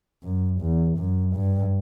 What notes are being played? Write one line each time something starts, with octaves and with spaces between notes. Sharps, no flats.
F#2
E2
F#2
G2